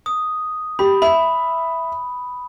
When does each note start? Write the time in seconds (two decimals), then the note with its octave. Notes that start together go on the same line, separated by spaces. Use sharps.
0.06 D#6
0.79 G4 B5
1.02 E5 B5